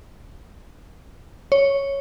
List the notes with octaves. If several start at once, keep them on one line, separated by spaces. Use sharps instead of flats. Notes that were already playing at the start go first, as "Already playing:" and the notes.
C#5